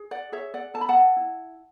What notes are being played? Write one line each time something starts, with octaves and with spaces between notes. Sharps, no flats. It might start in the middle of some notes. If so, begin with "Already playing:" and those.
Already playing: G#4
D5 F#5
G#4 C#5 E5
D5 F#5
A4 A5
B5
F#5 A5
E4